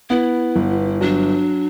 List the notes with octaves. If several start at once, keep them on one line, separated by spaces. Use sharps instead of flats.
B3 E4
G1
F#3 D4